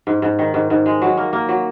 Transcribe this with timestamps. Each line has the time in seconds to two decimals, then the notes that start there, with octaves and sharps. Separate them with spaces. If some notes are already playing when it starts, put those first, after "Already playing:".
0.07 G#2
0.22 G#2
0.39 D#3
0.54 G#2
0.70 G#2
0.86 G#3
1.02 F#3
1.17 A#3
1.33 A#3
1.49 F#3